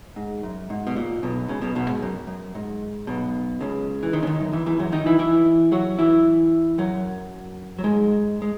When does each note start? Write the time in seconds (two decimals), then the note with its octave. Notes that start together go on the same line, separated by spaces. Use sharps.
0.16 G#2
0.43 F#2
0.70 G#2
0.87 B2
0.96 A#2
1.23 B1 B2
1.48 C#2 C#3
1.61 B1 B2
1.75 B1 B2
1.89 G#2
2.02 F#2
2.27 F#2
2.55 G#2
3.07 B1 B2
3.61 C#2 C#3
4.03 E3
4.13 D#2 D#3
4.23 C#3
4.27 D#2 D#3
4.40 F#2
4.53 E2 E3
4.66 E2 E3
4.79 F#2 F#3
4.92 D#3 D#4
5.06 E3 E4
5.19 E3 E4
5.72 F#3 F#4
5.99 E3 E4
6.78 F#2 F#3
7.79 F#3
7.84 G#2 G#3
8.42 G#3